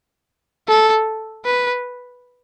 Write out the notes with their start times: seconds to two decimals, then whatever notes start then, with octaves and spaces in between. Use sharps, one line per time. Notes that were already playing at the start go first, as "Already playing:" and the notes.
0.68 A4
1.45 B4